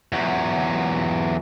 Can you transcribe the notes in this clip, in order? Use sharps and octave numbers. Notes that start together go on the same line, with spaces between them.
E2 F#3